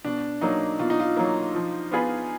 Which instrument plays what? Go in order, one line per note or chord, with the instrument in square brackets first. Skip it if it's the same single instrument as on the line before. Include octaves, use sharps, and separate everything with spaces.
[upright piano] B2 [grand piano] D4
[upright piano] F#3 A#3 [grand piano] D#4
[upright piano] B2 [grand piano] F4
[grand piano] D#4
F4
[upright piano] F#3 A#3
F3
B3 F4 G#4 B4